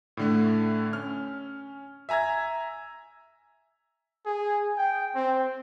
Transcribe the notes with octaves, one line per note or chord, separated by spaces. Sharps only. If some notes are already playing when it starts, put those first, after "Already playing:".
A2 D3 A3
C#4 F6
E5 G#5 A#5 E6 G#6
G#4
G5
C4